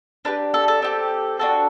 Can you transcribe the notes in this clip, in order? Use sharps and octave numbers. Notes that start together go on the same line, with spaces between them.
D4 G4 B4
A4
A4
C4 G4
D4 F#4 A4